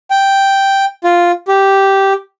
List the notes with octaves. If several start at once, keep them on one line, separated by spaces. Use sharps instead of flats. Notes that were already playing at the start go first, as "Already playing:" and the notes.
G5
F4
G4